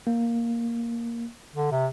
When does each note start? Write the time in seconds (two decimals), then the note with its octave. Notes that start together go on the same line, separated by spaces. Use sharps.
0.07 A#3
1.56 D3
1.72 C3